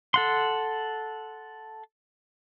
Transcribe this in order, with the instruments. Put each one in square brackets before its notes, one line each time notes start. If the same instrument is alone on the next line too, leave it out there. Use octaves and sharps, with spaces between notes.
[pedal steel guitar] A4 F#5 C6